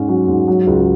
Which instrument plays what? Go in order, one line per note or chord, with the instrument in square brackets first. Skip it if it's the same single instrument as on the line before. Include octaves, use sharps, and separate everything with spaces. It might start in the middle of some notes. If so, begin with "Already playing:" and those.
Already playing: [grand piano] G#2 C#4
F#3
G#2
F#3
C#2